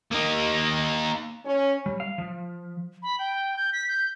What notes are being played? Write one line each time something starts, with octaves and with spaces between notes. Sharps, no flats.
A#3 D#4
C#4
G3
F5
F3
B5
G5
G6
B6
G6